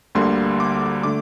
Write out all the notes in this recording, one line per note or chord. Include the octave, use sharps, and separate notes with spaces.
D2 D3 G3 A#3 C6
D6
D3 A3 D6